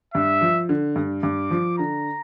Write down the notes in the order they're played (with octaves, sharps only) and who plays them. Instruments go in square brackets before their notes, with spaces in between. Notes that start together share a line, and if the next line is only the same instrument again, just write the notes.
[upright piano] G2 [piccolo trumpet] E5
[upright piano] F3
D3
G2
[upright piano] G2 [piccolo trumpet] D6
[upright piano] F3
[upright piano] D3 [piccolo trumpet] A#5